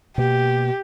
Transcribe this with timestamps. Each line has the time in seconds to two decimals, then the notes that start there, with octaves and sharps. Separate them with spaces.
0.18 B2 A#3 G4